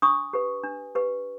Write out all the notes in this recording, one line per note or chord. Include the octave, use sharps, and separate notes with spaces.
D4 C#6 D#6
G4 B4
D4
G4 B4